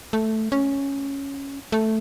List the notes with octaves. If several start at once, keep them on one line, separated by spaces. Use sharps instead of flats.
A3
C#4
A3